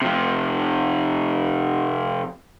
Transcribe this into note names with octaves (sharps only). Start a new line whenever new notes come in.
C3 F3